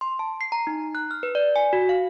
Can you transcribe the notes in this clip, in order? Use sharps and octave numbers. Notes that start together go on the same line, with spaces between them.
C6
A5
C7
A#5
D#4
F#6
F6
B4
D5
G#5
F#4
F5